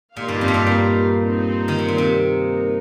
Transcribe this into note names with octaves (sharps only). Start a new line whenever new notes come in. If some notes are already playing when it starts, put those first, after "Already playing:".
A#2 D#4 G4 A#4 F5
G2
F2
A#2
G2
A#2
C4 D#4 C5
D#3
C3
A#2
C3
A#3 D#4 A#4